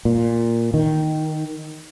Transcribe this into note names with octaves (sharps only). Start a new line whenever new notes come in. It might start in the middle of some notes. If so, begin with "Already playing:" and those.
A#2
D#3